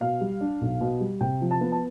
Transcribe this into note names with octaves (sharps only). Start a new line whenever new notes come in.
B2 F5
G3
D4
B1
B2
G3
C3 G5
F3
A5
B3
A5